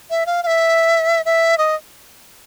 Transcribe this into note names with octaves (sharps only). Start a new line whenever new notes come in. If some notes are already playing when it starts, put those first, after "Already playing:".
E5
F5
F5
E5
E5
D#5